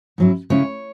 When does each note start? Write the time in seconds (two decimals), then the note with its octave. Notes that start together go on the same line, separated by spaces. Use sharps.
0.18 G#2 F#3 C#4 E4
0.50 C#3 G#3 C#4 E4 C#5